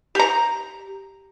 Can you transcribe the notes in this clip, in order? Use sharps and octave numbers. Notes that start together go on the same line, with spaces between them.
G4 A#5